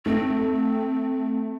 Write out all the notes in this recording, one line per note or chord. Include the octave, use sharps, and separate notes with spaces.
A3 C4